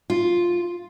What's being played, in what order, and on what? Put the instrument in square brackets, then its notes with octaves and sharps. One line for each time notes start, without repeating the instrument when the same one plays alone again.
[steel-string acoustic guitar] F4